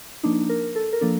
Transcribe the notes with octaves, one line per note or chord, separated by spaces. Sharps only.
F3 A#3 D4 D#4
A#4
A4
A#4
F3 A#3 D4 A4